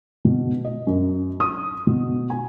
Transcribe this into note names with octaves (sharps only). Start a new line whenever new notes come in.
B2
D#5
F#2
D#6
B2
G#5